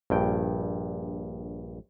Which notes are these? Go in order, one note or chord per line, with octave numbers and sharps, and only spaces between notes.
A#1 G2 G5